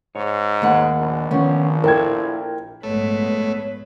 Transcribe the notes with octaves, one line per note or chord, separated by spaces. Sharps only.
G#2 C#5
D#2 F#5
A#1
D#3 F3 B3 C#4
E4 A4 A#4 G5 G#6
A#1 G#2 G#3 A3 B3 B4 C#5